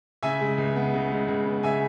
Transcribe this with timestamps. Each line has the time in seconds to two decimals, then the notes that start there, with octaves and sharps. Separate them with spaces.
0.23 C#3 E5 G#5
0.41 G#3
0.58 C#2
0.76 B3
0.94 C#3
1.11 G#3
1.28 C#2
1.46 B3
1.63 C#3 E5 G#5